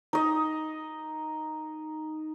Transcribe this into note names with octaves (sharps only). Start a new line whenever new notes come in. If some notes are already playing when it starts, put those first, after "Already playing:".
D#4 D#5